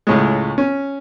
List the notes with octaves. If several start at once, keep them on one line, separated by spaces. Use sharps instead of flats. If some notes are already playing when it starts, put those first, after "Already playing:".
C#2 A2 G#3
C#4